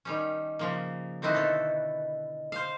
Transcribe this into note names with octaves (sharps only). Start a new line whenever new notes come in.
D#3 G3 C#4
C#3 F3 A#3
D3 D#3 C4 D#4 E4 F#4
B2 A4
C5 F5